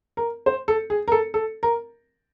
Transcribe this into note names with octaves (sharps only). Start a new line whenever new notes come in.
A#4
C5
A4
G#4
A#4
A4
A4
A#4